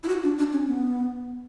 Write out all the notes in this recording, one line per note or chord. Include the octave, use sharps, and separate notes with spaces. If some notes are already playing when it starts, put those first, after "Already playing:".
E4
F#4
D4
D4
C#4
B3